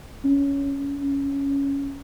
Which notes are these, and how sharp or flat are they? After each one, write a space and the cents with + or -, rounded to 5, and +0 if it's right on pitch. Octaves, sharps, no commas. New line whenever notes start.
C#4 +15
C#4 +5